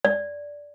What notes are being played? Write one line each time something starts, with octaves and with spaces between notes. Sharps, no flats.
D5